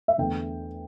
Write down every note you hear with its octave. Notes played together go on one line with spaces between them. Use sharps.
E5
E2 D3 A3 G5